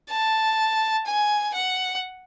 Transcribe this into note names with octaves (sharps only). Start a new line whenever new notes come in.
A5
G#5
F#5